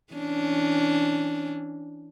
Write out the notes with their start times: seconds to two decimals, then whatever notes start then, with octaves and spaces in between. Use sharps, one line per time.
0.13 E3 C#4 D4